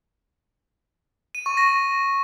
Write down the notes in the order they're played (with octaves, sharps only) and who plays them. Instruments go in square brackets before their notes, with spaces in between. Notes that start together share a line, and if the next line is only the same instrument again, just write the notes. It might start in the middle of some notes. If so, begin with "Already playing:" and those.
[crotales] D#7
C#6
A#6